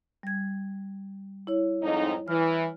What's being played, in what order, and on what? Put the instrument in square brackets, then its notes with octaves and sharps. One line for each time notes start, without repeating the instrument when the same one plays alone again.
[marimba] G3 G#6
E4 C#5
[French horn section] F2 G#2 D#4
[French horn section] E3 [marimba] F6